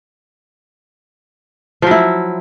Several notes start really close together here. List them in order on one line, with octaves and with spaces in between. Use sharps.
F3 F#3 E4